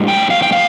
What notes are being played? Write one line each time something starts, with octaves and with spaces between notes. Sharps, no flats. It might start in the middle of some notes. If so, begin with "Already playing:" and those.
Already playing: A2 G3 D4
G5
F5
G5
F5